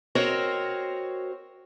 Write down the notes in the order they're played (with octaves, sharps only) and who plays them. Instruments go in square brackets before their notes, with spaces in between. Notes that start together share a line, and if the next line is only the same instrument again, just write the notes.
[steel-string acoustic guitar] C4 F#4 A#4 C5 C#5 D#5